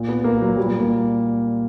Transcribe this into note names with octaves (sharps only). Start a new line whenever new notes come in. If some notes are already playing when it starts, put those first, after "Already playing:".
Already playing: A#2
B3
A#3
F#3
A#2 G3
A#3